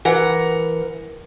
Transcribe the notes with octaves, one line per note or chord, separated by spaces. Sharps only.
E3 A#4 F#5